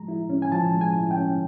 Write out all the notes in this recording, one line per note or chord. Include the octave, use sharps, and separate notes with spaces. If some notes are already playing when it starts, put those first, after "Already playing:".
Already playing: F3 G#3 A#5
E4
C#4
G#5
F3 A5
G#3
G#5
E4
G5
C#4